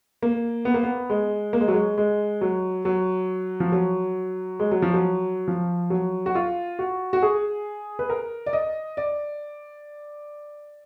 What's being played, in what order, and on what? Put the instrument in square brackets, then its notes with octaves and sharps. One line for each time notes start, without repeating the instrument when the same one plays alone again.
[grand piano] A#3
B3
A#3
B3
G#3
A#3
G#3
F#3
G#3
G#3
F#3
F#3
F3
F#3
G#3
F#3
F3
F#3
F3
F#3
F#4
F4
F#4
F#4
G#4
B4
A#4
D5
D#5
D5